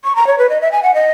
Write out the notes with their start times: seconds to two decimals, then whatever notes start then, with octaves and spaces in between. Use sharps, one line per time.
0.04 C#6
0.16 A#5
0.27 C#5
0.38 B4
0.49 D#5
0.61 E5
0.72 G#5
0.83 F#5
0.94 D#5